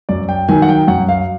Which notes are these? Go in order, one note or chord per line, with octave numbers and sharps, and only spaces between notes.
F#2 D5
G5
D#3 F#3 G#5
F#5
G5
F#2 F#5
F5